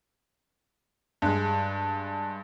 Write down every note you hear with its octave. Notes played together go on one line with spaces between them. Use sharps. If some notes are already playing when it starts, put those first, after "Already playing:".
G2 G#3